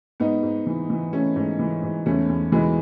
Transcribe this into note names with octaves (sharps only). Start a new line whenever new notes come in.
G#2 B3 D#4
G#2
E3
E3
E3 A3 C#4
G#2
E3
G#2
E2 A3 C#4
E2
B2 E3 G#3